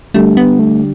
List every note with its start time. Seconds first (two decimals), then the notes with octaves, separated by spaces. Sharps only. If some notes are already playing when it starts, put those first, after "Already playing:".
0.14 D3 G3 A3 D4 G4
0.37 B3
0.59 A3